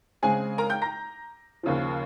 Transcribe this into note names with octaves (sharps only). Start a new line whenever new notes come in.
C#3 G#3 C4 G#4 G#5
A#4 A#5
G5 G6
A#5 A#6
D#2 C#3 F3